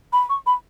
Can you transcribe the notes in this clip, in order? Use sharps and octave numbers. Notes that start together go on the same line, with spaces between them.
B5
C#6
B5